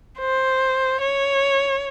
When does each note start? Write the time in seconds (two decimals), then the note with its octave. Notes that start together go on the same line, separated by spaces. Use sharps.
0.19 C5
1.01 C#5